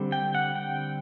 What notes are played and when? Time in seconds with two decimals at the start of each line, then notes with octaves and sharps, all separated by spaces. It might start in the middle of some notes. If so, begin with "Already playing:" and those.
Already playing: D3 G3 C4
0.12 G5
0.35 F#5
0.55 G5